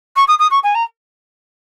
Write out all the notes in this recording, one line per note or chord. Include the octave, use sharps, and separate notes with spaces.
C#6
D#6
D#6
C#6
G#5
A#5